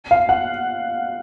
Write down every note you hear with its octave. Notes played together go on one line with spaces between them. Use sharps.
F5
F#5